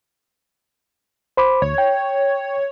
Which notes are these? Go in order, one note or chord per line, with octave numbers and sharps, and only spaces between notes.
C5 B5 D6
D2 C#5
G5